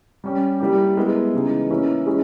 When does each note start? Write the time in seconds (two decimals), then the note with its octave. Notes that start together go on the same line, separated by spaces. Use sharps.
0.24 G3 C#4 G4
0.60 G3 A#3 E4 G4
0.97 G#3 B3 E4 A#4
1.34 C#3 E3 G#3 D#4 G#4
1.70 E3 A#3 C#4 E4
2.06 G#3 C#4 E4 G#4